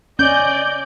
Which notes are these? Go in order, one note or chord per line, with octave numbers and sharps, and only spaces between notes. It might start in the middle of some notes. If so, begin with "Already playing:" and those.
C#4 D5 D#5 G6